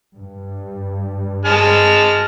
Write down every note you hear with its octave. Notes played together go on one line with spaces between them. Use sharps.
G2
G#3 A5 F6